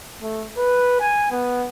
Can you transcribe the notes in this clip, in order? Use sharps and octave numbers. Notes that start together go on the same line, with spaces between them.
A3
B4
G#5
B3